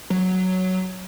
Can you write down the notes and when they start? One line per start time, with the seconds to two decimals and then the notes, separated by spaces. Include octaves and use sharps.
0.10 F#3